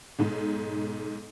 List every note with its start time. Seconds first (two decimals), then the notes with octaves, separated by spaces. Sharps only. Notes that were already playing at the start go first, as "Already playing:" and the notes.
0.19 B1 G#2